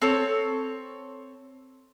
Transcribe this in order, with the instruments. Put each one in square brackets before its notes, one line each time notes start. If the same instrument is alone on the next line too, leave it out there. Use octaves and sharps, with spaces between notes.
[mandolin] C4 A4 C#5